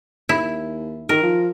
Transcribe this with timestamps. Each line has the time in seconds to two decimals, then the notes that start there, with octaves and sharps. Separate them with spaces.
0.29 D#2 E4
1.09 D#3 A#4
1.23 F3